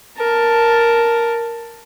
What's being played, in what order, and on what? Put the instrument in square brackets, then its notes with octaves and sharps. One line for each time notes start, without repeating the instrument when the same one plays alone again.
[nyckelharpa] A#4 A5